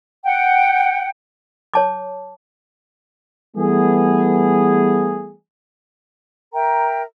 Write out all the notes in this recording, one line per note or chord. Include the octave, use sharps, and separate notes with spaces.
F#5 G5
C#5 A5 D6
E3 G3 A3 B3 G#4
A#4 E5 G5 A#5